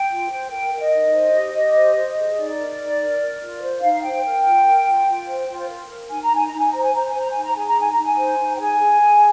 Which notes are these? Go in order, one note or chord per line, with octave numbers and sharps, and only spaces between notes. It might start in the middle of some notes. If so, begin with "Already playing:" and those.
Already playing: G5
F4
C5
A#4 G5
A#4
D#5
D#4
C5
G4
G4
C5
C5
G#4
D#4 D5
A#4
D#4
A#4
A#4
F4
C5
D#4 F5
C5 G5
A#4
F4
A#4
F4
F4
C5
F4
A#4
A#4
D#4 G#5
A#5
D#4 G#5
D#4 A#5
G#5
C5 A#5
G#5
C5 A#5
G#5
C5
A#5
D#4 G#5
A#5
G#4 G#5
A#5
D#4 G#5
D#4 A#5
G#5
C5
D#4
G5
G#4 G#5
G#4
G#4